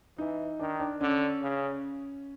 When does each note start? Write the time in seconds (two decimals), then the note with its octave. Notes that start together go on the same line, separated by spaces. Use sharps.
0.18 E3 D#4
0.60 D#3 D4
0.80 D4
1.01 D3 C#4
1.42 C#3